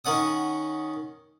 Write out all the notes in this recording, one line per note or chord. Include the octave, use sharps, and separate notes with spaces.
D#3 C#4 F#5 D#6